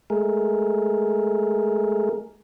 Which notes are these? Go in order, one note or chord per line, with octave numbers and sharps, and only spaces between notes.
G#3 A3 G#4 A#4